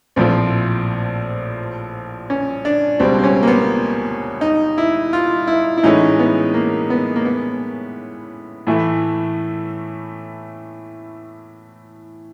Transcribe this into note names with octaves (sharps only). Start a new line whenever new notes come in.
A#1 A2 F3 C4
C#4
D4
C#2 B2 G3 C4
C4
C#4
A#3
B3
D#4
E4
F4
E4
E4
A2 E3 G#3 C#4 D#4
B3
A#3
B3
A#3
B3
A2 E3 A3